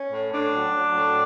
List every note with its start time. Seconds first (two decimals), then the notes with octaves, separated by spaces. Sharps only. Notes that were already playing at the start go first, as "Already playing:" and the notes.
Already playing: C#4
0.12 A2
0.33 A2 D4
0.54 F#3
0.75 F#3
0.96 A2